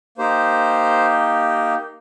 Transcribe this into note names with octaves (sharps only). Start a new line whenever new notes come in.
A#3 D#4 G4 C5